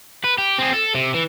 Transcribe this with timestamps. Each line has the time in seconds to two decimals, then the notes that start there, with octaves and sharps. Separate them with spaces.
0.24 B4
0.38 G4
0.58 C4 G#4
0.73 A4
0.94 C3
1.14 E3